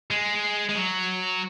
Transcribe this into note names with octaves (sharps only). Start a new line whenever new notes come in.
G#3
G#3
F#3